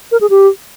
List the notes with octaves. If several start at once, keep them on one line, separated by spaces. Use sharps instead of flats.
A#4
G#4
G4